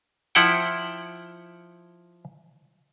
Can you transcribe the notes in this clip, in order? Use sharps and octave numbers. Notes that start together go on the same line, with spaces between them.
F3 E4 F#5 G5